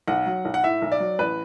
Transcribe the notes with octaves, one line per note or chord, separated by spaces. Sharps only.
B1 F#5
F#3
B1
F#5
A2 E5
B1
D5
F#3
A1 B4